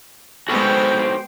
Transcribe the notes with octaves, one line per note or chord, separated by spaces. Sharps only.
G#3 B3 F#4 A4 B4 C5 G5